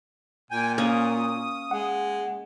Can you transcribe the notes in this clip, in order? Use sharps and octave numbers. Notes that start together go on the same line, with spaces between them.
A#2 G5 G#5
A#3 C#4 D#6
G#3 F#5